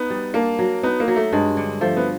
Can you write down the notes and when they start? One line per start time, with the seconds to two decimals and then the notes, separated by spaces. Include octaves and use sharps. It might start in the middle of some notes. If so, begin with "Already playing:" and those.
Already playing: B3 D#4
0.10 G3
0.34 A#3 D4
0.59 F#3
0.83 B3 D#4
1.00 A#3
1.08 F#3
1.16 A3
1.32 G2 G#3
1.57 D3
1.81 F3 A3
1.97 B3